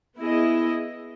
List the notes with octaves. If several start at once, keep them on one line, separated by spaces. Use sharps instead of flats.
B3 E4 G#4 D#5